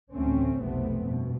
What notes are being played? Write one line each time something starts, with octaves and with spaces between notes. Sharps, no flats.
A1 D2 A2 A3 C4 C#4
F1 B1 C3 A3 B3 C4
G2 B2